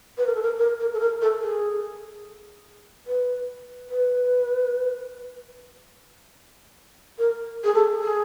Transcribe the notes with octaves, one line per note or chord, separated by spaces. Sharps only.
B4
A#4
A4
A#4
A#4
A#4
A4
A#4
A4
G#4
B4
B4
A#4
G#4
A4
G#4